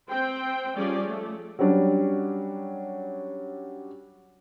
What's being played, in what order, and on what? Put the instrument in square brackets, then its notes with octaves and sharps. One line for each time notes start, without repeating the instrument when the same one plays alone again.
[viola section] C4 C5 G5
F3 G3 C#4 G#4 D5
A3
[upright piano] F#3 G3 C#4 D4